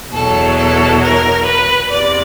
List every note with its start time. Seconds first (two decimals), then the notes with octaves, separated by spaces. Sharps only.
0.13 E2 B2 F#3 A4
0.58 A4
1.03 A#4
1.46 B4
1.90 E2 C3 D5